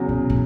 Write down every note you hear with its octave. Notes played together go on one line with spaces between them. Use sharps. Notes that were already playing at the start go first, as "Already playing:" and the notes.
Already playing: E2 C#3 F#3
B2
A2